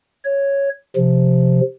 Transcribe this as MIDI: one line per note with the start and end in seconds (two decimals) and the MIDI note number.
0.25 0.69 73
0.96 1.60 48
0.96 1.60 53